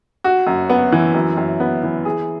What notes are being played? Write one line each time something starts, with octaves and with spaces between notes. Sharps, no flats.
F#4
F#2
B3
E3
F#2
F#2
B3
E3
G#4